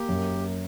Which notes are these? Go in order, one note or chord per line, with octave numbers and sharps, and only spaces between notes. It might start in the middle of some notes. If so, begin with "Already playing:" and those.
Already playing: A#3 G4
F#2